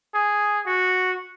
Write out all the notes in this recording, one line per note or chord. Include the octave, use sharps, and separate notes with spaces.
G#4
F#4